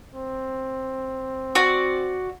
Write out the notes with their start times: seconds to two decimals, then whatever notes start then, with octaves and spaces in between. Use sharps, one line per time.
0.14 C4
1.55 F#4 D5